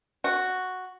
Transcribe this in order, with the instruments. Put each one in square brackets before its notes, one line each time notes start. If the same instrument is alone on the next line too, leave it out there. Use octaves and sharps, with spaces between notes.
[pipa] F#4